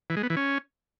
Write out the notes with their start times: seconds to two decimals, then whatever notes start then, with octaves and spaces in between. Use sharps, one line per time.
0.10 E3
0.17 G#3
0.23 B3
0.30 E3
0.37 C#4